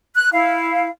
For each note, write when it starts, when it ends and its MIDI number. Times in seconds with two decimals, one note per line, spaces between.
0.15 0.29 90
0.32 0.88 64
0.32 0.88 77